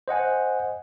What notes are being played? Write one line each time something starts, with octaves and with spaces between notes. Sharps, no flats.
C5 D#5 F#5 G#5